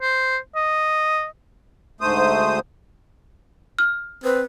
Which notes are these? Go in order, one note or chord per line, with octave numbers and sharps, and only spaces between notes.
C5
D#5
D2 G#2 A3 C5 D#6
F6
C4 B4